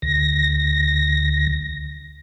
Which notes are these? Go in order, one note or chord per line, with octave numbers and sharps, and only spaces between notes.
D2 A#6